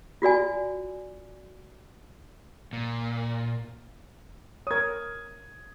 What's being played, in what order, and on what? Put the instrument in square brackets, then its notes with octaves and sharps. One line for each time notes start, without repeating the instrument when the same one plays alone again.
[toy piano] F4 F#4 D5 G#5
[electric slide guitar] A#2
[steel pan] A#4 C#5 [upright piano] D#6 G#6